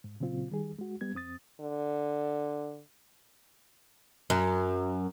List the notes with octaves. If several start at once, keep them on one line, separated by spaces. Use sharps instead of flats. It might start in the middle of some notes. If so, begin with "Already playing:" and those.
G#2
A#2 C#3 F#3 C4 F4
D#3 G3 G#4
G#3 F#4
G3 B3 G#6
F2 C4 D#6 A6
D3
F#2